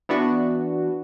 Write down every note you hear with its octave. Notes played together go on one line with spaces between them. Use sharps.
E3 B3 D4 F#4